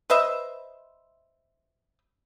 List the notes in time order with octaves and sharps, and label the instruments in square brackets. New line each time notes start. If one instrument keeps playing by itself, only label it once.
[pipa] B4 C5 D#5 E5